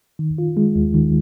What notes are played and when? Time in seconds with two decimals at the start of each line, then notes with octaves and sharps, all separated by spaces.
0.19 D#3
0.38 F4
0.57 G#3
0.75 D#2
0.94 D#3